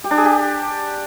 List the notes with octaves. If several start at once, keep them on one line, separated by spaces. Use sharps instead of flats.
G4
D4
G#4
G4